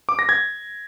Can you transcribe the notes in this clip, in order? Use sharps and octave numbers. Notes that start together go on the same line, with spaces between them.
D6
A#6
G#6